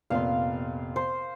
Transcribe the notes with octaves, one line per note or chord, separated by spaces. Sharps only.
F1 A#2 B3 F5 C6
C5